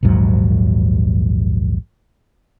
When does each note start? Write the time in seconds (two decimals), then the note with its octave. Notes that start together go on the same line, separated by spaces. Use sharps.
0.03 A#1 D#2 G#2 F#3